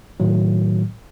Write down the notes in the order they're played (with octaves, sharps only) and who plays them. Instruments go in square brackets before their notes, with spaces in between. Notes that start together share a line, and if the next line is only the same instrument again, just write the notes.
[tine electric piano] A2 D#3 F#3